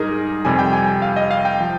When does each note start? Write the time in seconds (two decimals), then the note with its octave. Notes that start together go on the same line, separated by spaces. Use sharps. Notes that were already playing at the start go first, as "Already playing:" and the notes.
Already playing: G#2 G3 D#4 G#4 A#4
0.45 F2 C3 G3 G#5
0.59 G5
0.73 G#5
0.87 G5
1.02 F5
1.16 D#5
1.31 F5
1.45 G5
1.61 F3